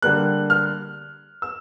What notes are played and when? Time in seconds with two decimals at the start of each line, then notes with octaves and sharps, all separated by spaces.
0.02 D3 G3 A#3 F#6
0.50 F6
1.42 E6